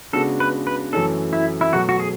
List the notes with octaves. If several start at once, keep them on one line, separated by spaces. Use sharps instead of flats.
C#3 G#3 B3 D4 F#4 A4
B4
B4
F#2 E3 A3 C#4 A4
E4
E4
B2 F#3 A3 F#4
F#4
G#4